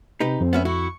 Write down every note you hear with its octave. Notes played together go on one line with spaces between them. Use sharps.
C3 D#4 G4 B4
F2 C4
B3 C#4 E5
E4 F#4 C#6